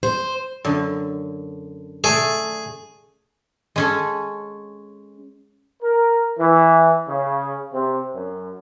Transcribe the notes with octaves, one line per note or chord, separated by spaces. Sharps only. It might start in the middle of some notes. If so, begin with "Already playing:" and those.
C5
F#2 D3
A3 G#4 D5
G#3 C#4 A4
A#4
E3
C#3
C3
F#2